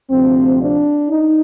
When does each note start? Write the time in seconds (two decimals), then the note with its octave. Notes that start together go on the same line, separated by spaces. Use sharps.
0.11 D2 C3 F3 C4
0.60 D4
1.09 D#4